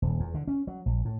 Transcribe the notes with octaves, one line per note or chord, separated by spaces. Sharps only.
D#1
E2
D3
C#4
F#3
A#1
A2